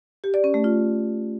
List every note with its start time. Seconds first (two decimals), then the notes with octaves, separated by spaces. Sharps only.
0.24 G4
0.34 D5
0.44 C#4
0.54 A3
0.64 F4